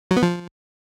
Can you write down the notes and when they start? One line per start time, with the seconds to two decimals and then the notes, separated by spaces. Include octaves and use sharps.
0.11 F#3
0.17 B3
0.22 F3